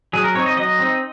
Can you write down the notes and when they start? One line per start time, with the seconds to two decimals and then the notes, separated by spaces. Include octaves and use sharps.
0.13 F#3 G#4
0.24 A#4
0.35 C4 D#4 C#5
0.46 D#5
0.57 F#3 D#5
0.79 C4 D#4